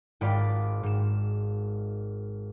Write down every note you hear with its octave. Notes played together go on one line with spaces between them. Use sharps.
G#1 G#2 F4 D5 B5
G#2 E7